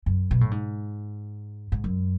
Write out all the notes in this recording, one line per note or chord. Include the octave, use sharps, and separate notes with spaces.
F#2
B2
A2
G#2
G#2
F#2